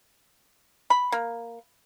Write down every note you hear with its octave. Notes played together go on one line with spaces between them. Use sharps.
B5
A#3